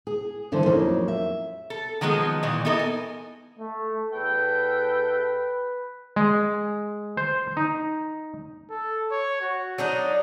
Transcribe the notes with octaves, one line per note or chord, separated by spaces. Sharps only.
G#4
G2 D3 E3 E4 A4 C5
F2 F#3 A#3 C#4 D#4
E5
A4
D#3 F3 F#3 G#3 B3
A#2 D#3 E3
B3 D#4 E4 A4 A#4
G#5
A3
E2 A4 B4 G5
G#3
C5
D#4
A4
C#5
F#4
F#3 D4 D#4